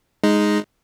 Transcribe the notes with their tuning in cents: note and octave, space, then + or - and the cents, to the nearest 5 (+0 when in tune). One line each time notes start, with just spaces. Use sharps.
G#3 +0 D#4 +0